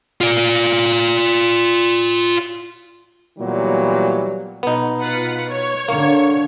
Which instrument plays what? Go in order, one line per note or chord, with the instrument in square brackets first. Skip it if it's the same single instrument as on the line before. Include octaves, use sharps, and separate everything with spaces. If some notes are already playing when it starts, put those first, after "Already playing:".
[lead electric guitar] F4 D5
[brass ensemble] A#2 E3 F#3 G3 B3
[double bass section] B2 [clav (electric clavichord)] B3 D#4
[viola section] F4 B4 F#5
C#5
[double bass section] D3 [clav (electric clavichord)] A#3